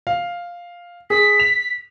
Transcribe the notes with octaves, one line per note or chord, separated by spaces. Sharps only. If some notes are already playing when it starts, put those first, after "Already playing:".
F5
G#4 B6
F7